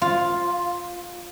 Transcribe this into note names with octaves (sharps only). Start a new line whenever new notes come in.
F4